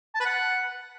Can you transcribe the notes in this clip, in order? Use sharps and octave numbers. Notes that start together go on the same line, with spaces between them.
A5
B4
F#5